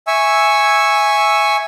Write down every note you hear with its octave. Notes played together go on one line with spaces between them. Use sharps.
E5 G#5 C#6 E6